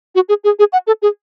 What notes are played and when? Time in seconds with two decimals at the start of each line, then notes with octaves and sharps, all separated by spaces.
0.15 F#4
0.29 G#4
0.44 G#4
0.59 G#4
0.73 F#5
0.87 A4
1.02 G#4